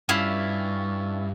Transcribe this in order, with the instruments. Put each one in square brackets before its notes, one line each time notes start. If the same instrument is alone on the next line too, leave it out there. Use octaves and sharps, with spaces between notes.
[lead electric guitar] G2 [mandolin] C#4 E4 F4